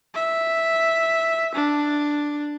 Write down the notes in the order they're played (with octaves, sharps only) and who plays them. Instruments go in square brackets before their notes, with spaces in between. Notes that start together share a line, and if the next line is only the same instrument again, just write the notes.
[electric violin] E5
D4